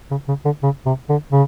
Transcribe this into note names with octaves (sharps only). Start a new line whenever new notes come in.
C#3
C#3
D3
C#3
C3
D3
C#3